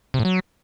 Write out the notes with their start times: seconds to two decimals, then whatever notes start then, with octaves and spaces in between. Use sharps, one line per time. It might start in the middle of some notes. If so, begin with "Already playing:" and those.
0.14 C3
0.19 A2
0.25 F#3